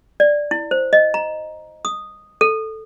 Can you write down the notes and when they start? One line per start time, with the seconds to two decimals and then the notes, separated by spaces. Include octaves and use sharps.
0.20 D5
0.51 E4
0.71 C5
0.93 D#5
1.14 A#5
1.85 D#6
2.41 A4